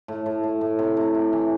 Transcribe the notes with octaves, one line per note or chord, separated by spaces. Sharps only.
A2
A2
A2
A2
C3
C3
C3
E3